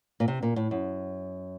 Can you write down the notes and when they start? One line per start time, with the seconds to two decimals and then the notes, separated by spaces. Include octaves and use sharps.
0.20 A#2
0.28 C3
0.42 A#2
0.56 A2
0.71 F#2